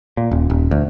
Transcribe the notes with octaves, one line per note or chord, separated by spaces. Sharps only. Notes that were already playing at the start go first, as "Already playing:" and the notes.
A#2
D#1
D#1
D2